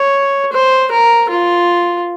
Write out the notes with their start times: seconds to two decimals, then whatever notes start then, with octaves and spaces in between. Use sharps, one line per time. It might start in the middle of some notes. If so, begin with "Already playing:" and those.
Already playing: C#5
0.52 C5
0.91 A#4
1.29 F4